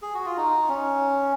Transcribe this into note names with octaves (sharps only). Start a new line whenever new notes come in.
G#4
F#4
F4
D#4
C#4